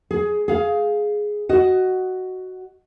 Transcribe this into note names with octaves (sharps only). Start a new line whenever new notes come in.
G#4
G#4 F5
F#4 D#5